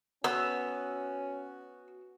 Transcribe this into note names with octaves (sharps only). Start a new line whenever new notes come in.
B3 C#4 F#4 E6